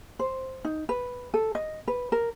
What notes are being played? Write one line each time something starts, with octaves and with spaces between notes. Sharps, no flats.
C5
D#4
B4
A4
D#5
B4
A#4